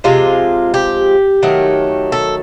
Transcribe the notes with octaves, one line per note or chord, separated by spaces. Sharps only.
C3 F3 G#3 F4
G4
D#3 F#3 A3
A4